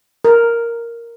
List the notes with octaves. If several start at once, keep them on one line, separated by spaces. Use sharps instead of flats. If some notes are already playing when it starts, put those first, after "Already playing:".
A#4